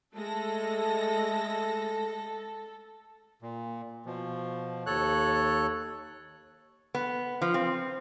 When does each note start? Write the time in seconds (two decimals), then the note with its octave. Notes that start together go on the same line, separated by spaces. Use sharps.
0.16 G#3 A3 A4 A#6
3.42 A#2
4.06 B2 F3
4.86 D#2 A4 C#5 F#6
6.95 B3
7.42 F3
7.54 C4